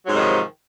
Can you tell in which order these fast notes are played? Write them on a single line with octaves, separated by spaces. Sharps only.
F#3 G#2 C3 D#3 F3